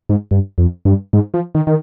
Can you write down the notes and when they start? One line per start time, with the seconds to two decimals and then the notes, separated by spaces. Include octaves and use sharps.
0.09 G#2
0.31 G2
0.58 F2
0.85 G2
1.13 G#2
1.34 F3
1.55 D#3
1.67 D#3